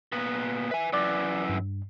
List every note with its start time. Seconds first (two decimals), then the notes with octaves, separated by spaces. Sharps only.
0.12 A#2 B3
0.71 B4 E5 G#5
0.93 F#2 E3 D5 D6 A6
1.49 G2